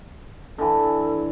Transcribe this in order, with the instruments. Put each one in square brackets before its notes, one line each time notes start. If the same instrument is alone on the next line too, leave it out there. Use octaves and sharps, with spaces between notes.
[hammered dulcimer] D3 E3 [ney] A4